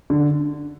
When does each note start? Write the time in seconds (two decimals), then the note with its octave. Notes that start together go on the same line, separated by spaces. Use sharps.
0.10 D3